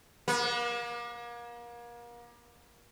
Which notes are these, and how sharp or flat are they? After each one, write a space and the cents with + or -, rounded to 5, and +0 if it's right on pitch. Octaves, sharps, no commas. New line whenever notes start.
A#3 +35